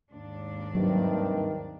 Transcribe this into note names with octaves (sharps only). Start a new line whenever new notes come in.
D#2 G#2 D4
G2 C3 D#3 F#3